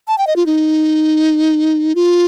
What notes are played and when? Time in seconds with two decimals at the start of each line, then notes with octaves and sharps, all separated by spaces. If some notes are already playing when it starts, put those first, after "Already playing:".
0.08 A5
0.18 G5
0.27 D#5
0.36 F4
0.46 D#4
1.95 F4